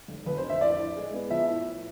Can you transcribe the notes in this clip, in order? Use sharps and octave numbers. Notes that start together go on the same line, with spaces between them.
F1
F2 B4
C5
D3
E5
A2 D5
A2
G#3
B3
F3 E5
A2
A2